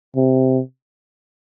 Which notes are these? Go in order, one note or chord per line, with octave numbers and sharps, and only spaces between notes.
C3